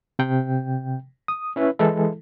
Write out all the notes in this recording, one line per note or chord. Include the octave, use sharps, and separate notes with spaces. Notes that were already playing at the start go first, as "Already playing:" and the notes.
C3 G5
D#6
C#4 E4 B4
E3 G#3 E4 A4